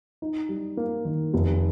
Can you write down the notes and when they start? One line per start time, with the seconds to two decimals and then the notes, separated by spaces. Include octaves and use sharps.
0.22 D#4
0.49 G3
0.77 A#3
1.05 D#3
1.34 F1